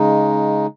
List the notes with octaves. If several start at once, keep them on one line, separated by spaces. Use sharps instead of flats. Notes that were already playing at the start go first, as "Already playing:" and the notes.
Already playing: C#3 G#3 D#4